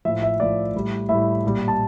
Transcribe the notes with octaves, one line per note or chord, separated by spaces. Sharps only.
A2 F3 E5
E5
A2 F3 D5
A2 G3
A2 G3 E5
A#2 G3
A5